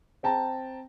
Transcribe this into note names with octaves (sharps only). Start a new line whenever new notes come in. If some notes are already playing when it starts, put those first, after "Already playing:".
C4 G5 A5 A#5